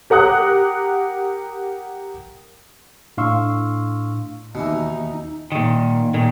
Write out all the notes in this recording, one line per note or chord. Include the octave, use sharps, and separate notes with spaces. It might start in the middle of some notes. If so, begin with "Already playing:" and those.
G4 A#4 F#5 D#6 F#6
A2 D4 F5 C6 C#6 E6
D#2 B2 E3 D#4
A#2 D#3
A#2 D#3